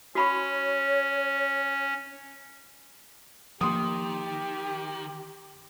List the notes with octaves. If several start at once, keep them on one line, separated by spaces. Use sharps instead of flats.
C#4 F#4 C#5 B5 C#6
D#3 F3 A#3 G4 C6 D#6